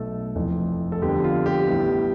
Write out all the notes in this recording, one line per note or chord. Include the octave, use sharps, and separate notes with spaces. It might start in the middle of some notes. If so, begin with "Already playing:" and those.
Already playing: B1 B2 A3 A4
F1 F2 E3 A3
A4
F2 D3 G3 B3 G4
F4
G4
A1 A2 G3 B3